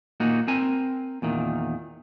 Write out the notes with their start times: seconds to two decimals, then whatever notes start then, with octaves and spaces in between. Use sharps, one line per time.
0.20 A#2 A#3 D#4 F#4
0.48 C4 A#4 G#5
1.22 E2 A#2 D#3